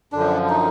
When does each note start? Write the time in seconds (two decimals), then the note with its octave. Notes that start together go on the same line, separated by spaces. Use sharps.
0.12 F#2 D3 F3 D4
0.49 D#4